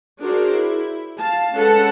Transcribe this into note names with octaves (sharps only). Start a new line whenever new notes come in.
D4 F#4 G#4 A#4 C5 D5
E4
F5 A5
G#3 C#4 A4 B4 F#5 A5